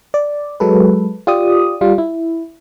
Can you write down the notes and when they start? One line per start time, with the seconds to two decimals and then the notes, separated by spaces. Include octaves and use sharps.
0.14 D5
0.60 F#3 G#3 A4 B4
1.27 F4 G4 D5 D#6
1.81 G3 F4
1.98 E4